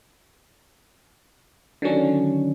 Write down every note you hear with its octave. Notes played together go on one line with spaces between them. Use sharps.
D3 D#3 F#3 C#4 D4